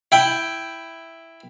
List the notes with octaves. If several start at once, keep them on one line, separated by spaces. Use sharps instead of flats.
E4 G5